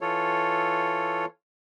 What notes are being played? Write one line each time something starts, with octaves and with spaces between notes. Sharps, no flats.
E3 F4 A4 C#5